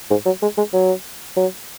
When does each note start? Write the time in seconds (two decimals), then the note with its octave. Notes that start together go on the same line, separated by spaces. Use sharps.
0.10 G#2
0.26 F#3
0.42 G#3
0.57 G#3
0.73 F#3
1.37 F#3